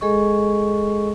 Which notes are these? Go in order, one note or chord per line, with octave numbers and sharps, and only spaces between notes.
G#3 G#4 A4 D#5 C#6